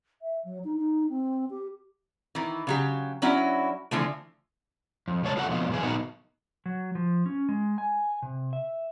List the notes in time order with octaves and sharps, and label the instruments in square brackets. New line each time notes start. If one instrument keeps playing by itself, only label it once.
[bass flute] E5
F#3
D#4
D#4
C4
G4
[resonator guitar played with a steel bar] D#3 E3
C#3 F#3 G4
F#3 C#4 D4 E4 F#4
D3 E3 F3 A3
[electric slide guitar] F2
C#3 G#3 C#5 A5
F#2 F4 A4 F#5
F2 B2 F4
G2 E3 G#4
A#2 A#3 B3 D#4 F#4
F#3
F3
C#4
G#3
G#5
C3
E5